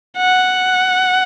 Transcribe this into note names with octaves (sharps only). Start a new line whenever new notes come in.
F#5